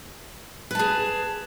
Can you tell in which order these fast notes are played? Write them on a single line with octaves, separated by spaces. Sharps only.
B4 A5 G#4